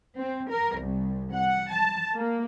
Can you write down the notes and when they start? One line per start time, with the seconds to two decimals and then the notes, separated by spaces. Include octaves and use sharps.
0.16 C4
0.50 A#4
0.79 C2
1.33 F#5
1.73 A5
2.16 A#3